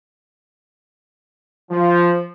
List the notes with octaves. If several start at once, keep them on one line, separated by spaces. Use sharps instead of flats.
F3